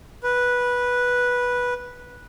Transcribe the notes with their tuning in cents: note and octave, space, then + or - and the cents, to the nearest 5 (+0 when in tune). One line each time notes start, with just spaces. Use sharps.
B4 -10